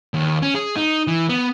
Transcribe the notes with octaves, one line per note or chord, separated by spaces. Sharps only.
D#2
C#4
G#4
D#4
E3
B3